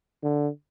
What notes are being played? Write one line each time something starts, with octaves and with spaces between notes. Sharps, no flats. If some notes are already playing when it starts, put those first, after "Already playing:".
D3